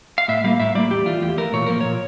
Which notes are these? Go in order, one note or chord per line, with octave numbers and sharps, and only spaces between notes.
F5
A2 E5
G3 A#3 F5
A2 E5
G3 A#3 D5
E2 G4
E3 A3 F4
E2 G4
E3 A3 A#4
A#2 C#5
F3 A#3 A#4
A#2 C#5